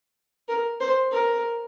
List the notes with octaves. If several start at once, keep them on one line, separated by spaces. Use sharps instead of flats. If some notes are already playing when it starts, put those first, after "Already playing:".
A#4
C5
A#4